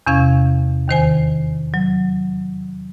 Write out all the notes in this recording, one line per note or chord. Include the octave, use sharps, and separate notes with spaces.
E2 C3 C#4 F5 G#6
D#2 D#3 C5 G#5
F#3